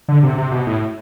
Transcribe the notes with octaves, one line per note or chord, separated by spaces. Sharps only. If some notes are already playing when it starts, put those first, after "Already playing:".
D3
C3
C3
B2
A2